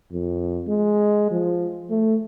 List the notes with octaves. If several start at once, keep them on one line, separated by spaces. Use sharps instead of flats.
F2
G#3
F3
A3